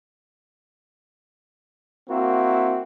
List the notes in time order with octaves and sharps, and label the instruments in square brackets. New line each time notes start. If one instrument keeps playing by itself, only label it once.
[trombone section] A#3 C4 E4 F#4